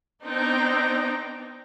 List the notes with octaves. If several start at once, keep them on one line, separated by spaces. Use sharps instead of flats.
B3 C4 D4 D#4 G5 A#5